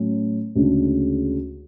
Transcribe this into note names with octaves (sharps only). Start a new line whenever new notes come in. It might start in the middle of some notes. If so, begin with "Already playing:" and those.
Already playing: A2 F#3 C#4
D2 C#3 G#3 D4